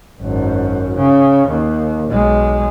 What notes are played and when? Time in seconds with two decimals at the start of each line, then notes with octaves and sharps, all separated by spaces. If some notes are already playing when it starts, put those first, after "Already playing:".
0.21 G#1 F#2
0.96 C#3
1.48 D#2
2.08 B1 G#3